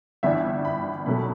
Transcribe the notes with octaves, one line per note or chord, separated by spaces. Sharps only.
G1 G2 E3 B3 D4 E5
B5
B1 B2 F#3 A3 B5